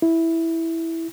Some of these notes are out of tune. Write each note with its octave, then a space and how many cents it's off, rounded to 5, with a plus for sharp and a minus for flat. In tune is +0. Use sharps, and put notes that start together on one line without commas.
E4 -5